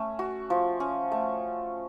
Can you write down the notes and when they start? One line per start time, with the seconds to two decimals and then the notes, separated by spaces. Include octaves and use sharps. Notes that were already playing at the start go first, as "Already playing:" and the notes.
Already playing: A3 C#4
0.19 F#4
0.50 F3
0.80 C#4
1.12 A3